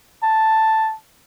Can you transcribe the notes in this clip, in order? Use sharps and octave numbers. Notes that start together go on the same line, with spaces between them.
A5